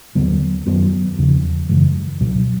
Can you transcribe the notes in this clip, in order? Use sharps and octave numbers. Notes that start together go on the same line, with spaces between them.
D#2 D3 F#3 B3
F#2 D#3 F#3 B3
E2 C#3 F3
F#2 C#3 E3 G#3
C#2 B2 F#3